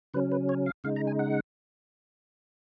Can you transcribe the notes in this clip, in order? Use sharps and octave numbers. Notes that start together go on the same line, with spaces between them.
C#3 F#3 C#4 B4
B4
C#5
F5
C#3 G#3 D#4 F5
A#5
G#5
F#5